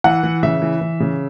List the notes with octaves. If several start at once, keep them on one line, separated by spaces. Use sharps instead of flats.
E3 F#5
E3
C#3 E5
E3
E3
C#3